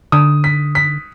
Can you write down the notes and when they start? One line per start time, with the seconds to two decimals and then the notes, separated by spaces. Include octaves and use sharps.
0.12 D3 D#6
0.44 B6
0.75 B6